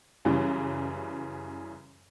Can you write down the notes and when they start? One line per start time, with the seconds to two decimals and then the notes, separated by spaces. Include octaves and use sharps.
0.25 F#2 C#3 E3 G3